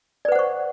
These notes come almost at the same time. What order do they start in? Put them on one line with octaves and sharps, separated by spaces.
D5 B4 F#5 C5 C#6